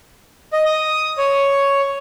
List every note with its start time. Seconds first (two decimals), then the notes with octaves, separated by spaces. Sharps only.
0.53 D#5
0.66 D#6
1.18 C#5